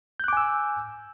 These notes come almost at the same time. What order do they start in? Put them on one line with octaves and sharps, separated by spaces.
G6 F#6 D6 G#5 E6